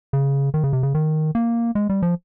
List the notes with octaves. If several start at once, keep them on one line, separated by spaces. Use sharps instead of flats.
C#3
D#3
C#3
C3
C#3
D#3
A#3
G#3
G3
F3